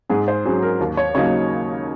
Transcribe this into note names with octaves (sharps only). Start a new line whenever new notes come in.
G#2 G#4
C5
F#3 C#4 G#4
A#4
D#2
C#5
C#3 F#3 A#3 D#4 C#5